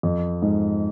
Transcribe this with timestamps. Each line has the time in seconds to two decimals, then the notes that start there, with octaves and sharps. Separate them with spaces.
0.03 F2
0.42 G#2